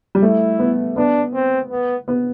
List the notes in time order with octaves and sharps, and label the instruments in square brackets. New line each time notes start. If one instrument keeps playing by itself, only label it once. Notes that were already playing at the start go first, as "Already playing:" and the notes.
[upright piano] G3
[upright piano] A3 [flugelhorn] E4
[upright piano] B3
[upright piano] B3 [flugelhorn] D4
[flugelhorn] C4
B3
[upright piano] B3